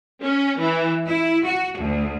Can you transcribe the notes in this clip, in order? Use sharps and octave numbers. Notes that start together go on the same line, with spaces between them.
C#4
E3
E4
F#4
D2